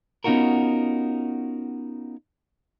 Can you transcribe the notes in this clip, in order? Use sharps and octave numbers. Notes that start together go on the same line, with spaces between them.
B3 C#4 D#4 F4 F#4 A#4